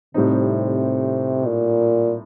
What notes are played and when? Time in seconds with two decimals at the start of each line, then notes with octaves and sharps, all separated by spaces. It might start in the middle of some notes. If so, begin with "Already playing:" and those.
0.14 A2 C3 G3 C4 D#4
1.46 A#2